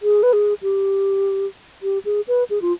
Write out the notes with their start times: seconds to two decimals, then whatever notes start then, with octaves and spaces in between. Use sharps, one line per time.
0.03 G#4
0.23 B4
0.33 G#4
0.63 G4
1.83 G4
2.05 G#4
2.28 B4
2.50 G#4
2.62 F4